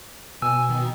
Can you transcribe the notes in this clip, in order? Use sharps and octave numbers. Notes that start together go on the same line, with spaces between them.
B2 G#5 E6
D#3